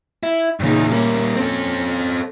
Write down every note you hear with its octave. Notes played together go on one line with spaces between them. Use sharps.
E4
E2 G2 A#2 C#3 D#4
G3 A#3 C#4 A#4
C4 C#4 A4